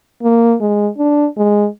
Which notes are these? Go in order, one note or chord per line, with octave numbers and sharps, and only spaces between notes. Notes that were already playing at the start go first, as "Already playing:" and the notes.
A#3
G#3
D4
G#3